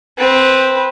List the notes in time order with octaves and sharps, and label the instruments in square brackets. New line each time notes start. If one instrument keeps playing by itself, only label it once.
[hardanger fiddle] C4 B4